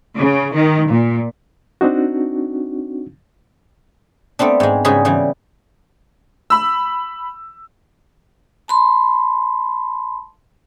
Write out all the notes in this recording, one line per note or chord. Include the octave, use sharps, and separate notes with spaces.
C#3
D#3
A#2
C4 D4 D#4 F#4
A3 B3 C4 D4
G#2 G#3
G#2 C#3 G3 F#4 G#4 B5
C#3 E3 G3
B5 E6
A5 B5 C6